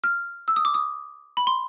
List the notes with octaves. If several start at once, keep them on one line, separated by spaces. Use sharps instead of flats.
F6
E6
D#6
D6
D#6
B5
C6